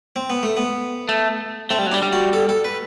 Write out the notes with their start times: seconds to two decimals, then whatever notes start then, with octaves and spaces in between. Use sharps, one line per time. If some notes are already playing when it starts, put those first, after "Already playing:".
0.16 C4
0.30 B3
0.43 A3
0.57 B3
1.09 A3
1.70 A3 C4
1.79 G3
1.86 F#3
1.92 G3 D4
2.02 G3
2.13 F#4
2.33 A4
2.49 A4
2.64 B4